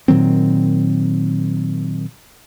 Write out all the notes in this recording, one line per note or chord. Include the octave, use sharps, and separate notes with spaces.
A#2 D#3 F#3 C4